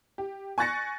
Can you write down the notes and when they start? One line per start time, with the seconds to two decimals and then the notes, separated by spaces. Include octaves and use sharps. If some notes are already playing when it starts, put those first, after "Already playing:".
0.18 G4
0.58 G#5 C#6 F#6 A6 A#6 C#7